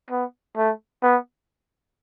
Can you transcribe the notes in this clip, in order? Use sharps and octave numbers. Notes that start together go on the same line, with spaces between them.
B3
A3
B3